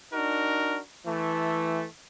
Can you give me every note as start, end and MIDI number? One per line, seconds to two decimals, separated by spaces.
0.13 0.79 62
0.13 0.79 63
0.13 0.79 66
0.13 0.79 70
1.06 1.84 52
1.06 1.84 57